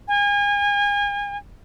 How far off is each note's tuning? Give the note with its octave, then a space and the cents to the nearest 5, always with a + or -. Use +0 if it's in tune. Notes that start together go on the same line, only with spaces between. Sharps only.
G#5 -35